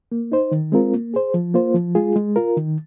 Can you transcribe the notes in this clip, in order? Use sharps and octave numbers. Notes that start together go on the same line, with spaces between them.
A#3
D#4 C5
D#3
G#3 C4 F4 A#4
A#3
G#4 C5
F3
A#3 F4 C5
F3
G#3 F4 G#4
G#3
F4 A#4
D#3